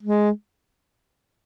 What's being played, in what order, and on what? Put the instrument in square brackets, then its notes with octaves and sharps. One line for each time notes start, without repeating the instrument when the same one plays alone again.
[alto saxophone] G#3